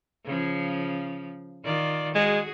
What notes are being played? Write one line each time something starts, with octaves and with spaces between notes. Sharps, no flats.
C#3 F3
D#3 F4 D5
G#3 F#4 G#4